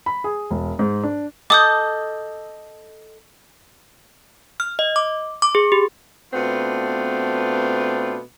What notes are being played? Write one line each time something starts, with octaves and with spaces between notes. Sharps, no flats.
B5
G#4
E1
G#2
D4
A4 D#5 A5 D6 D#6 G6
F6
D#5
D6
D6
G#4
G4
B2 A3 B3 C4 D4 F4